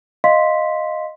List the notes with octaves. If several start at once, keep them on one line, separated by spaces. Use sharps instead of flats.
D#5 F5 C6 B6